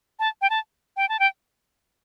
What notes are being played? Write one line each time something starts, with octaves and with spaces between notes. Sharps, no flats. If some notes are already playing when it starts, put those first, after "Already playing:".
A5
G5
A5
G5
A5
G5